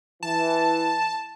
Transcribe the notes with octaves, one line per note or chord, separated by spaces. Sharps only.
E3 A5